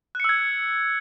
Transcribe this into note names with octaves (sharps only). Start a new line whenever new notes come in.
E6 F#6 G#6 C#7